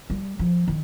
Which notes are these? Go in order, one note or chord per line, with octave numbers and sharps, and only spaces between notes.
G3
F3
D#3